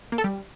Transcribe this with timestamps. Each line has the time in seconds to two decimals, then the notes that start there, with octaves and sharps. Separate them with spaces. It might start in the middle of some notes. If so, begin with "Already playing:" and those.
0.12 A#3
0.18 A4
0.24 G3